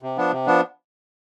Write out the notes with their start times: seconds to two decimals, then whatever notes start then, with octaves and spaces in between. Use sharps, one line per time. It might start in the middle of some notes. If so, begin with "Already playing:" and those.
0.03 C3
0.17 F3 B3 D4
0.32 C3
0.46 F3 B3 D4